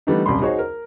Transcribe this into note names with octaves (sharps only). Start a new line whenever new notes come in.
E3 G3 A3 B3 D4 D#4
D#1 C2 F#2 B5 C6
D#4 F#4 G#4 C5 C#5
A#4